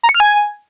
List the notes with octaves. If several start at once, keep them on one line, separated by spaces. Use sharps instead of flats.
A#5
C#7
F6
G#5